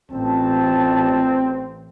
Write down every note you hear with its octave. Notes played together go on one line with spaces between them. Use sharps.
A1 E3 C4 F4 A5